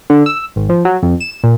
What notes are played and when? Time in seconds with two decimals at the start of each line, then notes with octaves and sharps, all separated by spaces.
0.10 D3
0.26 E6
0.56 G#1
0.69 F3
0.85 F#3
1.03 F2
1.20 E7
1.44 A#2